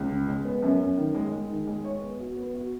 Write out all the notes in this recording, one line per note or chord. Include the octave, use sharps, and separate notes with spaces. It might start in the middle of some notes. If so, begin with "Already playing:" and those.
Already playing: C#2
C#3
G#3
B3
F#2
F#2
D#3
G#3
G#3
D#3
G#3
C#5
B3
F#4
B3
F#4